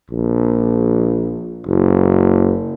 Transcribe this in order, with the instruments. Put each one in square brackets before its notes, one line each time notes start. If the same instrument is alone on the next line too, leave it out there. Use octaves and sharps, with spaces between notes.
[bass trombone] A#1
F#1